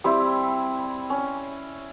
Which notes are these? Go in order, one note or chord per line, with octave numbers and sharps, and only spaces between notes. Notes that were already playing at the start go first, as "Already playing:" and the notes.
G3 C4 E4
C#4